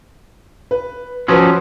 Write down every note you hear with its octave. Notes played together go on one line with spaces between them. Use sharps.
B4
F3 F#3 C#4 F#4 B4 C5